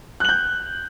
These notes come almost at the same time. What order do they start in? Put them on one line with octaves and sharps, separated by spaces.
F#6 F#7 G6